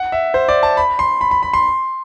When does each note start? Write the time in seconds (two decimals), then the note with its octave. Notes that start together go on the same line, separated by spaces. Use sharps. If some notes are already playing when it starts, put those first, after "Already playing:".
Already playing: F#5
0.12 E5
0.34 C5
0.49 D5
0.63 A5
0.77 B5
0.99 C6
1.21 B5
1.31 B5
1.43 B5
1.53 C6